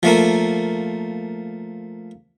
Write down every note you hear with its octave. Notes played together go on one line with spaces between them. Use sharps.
F3 A3 A#3